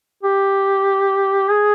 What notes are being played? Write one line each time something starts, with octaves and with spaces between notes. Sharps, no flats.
G4
G#4